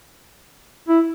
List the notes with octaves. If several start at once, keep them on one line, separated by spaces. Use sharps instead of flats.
E4